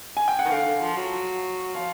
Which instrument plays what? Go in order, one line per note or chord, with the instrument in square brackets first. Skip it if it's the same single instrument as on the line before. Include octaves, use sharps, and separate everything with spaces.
[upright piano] G#5
G5
F#5
[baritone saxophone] D#3
[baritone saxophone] D3 [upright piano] F5
[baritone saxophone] D3
F3
F#3
[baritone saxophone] F3 [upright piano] F5